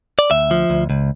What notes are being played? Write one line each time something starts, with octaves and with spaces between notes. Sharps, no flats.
D5
D2 E5
F3
D2
C#2